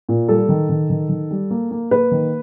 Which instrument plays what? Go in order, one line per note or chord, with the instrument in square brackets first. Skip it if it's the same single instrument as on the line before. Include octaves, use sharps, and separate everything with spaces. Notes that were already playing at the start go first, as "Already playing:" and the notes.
[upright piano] A#2
G3 A4
D#3
D#3
D#3
D#3
G3
A#3
A#3
A#3 B4
D#3